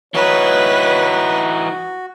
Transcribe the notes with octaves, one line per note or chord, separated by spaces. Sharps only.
E3 D#4 F#4 B4 C#5